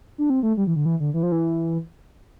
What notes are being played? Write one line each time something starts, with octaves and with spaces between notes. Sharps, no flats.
D4
C4
A3
G3
E3
D3
E3
D3
E3
F3
E3